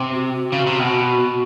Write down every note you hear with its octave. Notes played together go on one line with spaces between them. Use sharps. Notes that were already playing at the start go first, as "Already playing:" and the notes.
Already playing: C3
F#4
C#3
C3
B2